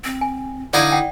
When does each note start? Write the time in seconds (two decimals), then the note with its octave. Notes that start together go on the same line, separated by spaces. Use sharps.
0.04 C4
0.21 G#5
0.74 D3 D#4 E4 D5 F5
0.92 F#5 G5